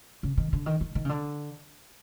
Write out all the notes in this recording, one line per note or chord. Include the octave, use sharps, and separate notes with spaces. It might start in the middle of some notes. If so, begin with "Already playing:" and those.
C#3
D#3
D3
D#3
D#3
D#3
C#3
D3